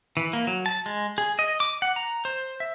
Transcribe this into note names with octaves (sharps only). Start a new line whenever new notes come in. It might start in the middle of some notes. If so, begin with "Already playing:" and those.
E3
A#3
F#3
A5
G#3
G#4
D#5
D6
F#5
A#5
C5
E5